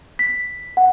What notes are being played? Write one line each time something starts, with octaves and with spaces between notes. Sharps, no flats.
B6
F#5